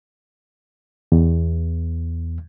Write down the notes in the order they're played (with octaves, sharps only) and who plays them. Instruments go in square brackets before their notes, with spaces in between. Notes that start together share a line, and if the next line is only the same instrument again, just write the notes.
[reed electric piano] E2